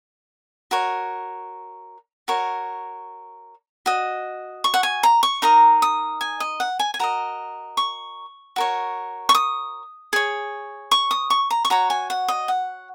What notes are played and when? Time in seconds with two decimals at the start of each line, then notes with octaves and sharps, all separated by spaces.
0.71 F#4 A#4 C#5
2.28 F#4 A#4 C#5
3.86 F#4 D#5
4.64 C#6
4.74 F#5
4.83 G#5
5.03 A#5
5.23 C#6
5.42 D#4 A#4 D#5 A#5
5.82 D#6
6.21 G#5
6.40 D#5
6.60 F#5
6.79 G#5
6.94 G#5
6.99 F#4 A#4 D#5 A#5
7.77 C#6
8.56 F#4 A#4 C#5
9.29 C#6
9.35 D#6
10.13 G#4 C#5
10.91 C#6
11.11 D#6
11.30 C#6
11.50 A#5
11.65 C#6
11.70 F#4 C#5 A#5
11.90 G#5
12.10 F#5
12.28 D#5
12.48 F#5